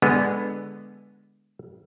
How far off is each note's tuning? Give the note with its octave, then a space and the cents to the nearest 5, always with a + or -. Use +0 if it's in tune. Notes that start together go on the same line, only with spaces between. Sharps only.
D3 +0 G#3 -15 B3 +0